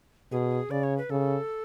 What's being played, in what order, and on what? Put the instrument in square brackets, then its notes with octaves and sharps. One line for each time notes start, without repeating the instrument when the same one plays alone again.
[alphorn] B2 [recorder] G#4
[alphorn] C#3 [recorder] D5
[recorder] C#5
B4
[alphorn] C#3 [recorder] A4